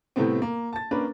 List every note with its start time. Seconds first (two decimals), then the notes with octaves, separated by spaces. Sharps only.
0.16 A2 C3 G3 A3 B3 C4
0.42 A#3
0.73 A5 A6
0.91 A#3 C#4 D4 B4